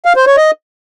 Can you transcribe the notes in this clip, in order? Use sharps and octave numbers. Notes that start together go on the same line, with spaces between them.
F5
C5
C#5
D#5